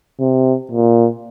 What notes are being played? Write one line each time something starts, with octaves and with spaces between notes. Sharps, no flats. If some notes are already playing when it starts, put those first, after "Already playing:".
C3
A#2